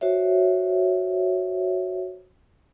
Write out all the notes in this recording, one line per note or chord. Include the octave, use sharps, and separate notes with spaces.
F#4 C5 C#5 E5